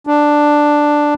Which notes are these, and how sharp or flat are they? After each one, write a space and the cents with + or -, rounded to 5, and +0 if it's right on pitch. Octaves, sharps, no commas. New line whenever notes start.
D4 +5